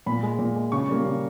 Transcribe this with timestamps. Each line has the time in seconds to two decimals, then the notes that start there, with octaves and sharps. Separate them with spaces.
0.06 A#2 B5
0.23 G#3
0.39 A#2
0.56 G#3
0.72 C#3 C#6
0.89 G3 A#3
1.05 C#3